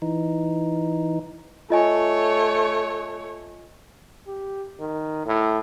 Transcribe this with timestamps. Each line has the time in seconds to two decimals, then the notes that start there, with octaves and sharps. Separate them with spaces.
0.02 E3 D#4
1.70 A3 F4 C#5 D#5 G#5
4.27 G4
4.80 D#3
5.26 A2